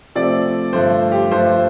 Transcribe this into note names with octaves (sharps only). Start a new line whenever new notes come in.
C3 F3 A3 D5
G2 D3 F3 A3 C5
G4
G2 D3 F3 A3 C5